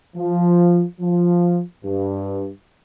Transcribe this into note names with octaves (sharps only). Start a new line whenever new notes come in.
F3
F3
G2